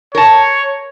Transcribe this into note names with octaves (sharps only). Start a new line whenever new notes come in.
A#4 C#5 A5